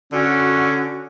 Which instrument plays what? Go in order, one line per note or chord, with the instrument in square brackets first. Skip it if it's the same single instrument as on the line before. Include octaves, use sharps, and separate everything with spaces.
[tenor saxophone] D3 [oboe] C#4 [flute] F#4